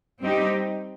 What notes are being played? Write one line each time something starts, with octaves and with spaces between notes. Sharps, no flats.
G3 C4 D#4 G4